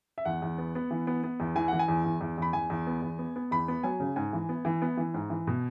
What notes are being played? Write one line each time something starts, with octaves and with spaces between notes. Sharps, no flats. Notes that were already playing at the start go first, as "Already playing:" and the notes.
E5
E2 F#5
E2
B3
B3
E3
B3
B3
E2
E3 G#5
E3 F#5
G#5
E2
E2
E2
E2 B5
E2 G#5
E2
B3
E2
B3
B3
E2 B5
B3
F#3 G#5
C#3
G#2 G#5
E3
B3
E3
B3
E3
G#2
E3
B2